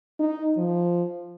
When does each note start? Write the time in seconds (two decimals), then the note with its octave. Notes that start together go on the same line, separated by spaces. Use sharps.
0.20 D#4
0.57 F3